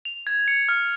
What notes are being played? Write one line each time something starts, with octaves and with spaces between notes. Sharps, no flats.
F7
G#6
C#7
F6